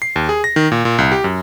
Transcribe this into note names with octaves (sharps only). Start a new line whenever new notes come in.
C7
D#2
G#4
A#6
D#3
A#2
A#2
C2
G4
F#2